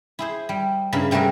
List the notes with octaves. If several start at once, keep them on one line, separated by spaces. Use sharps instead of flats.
E4 G#4 C5
G3
G2 C#3 A#3 E4 B5
C3 G3 A3 F#4 G#4 A#4